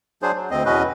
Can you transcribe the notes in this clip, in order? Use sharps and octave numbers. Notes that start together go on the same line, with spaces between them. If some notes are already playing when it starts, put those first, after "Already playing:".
F#3 D4 G#4 C5
F#3
D2 C4 D#5
E2 B2 C#4 F#4 B4 D#5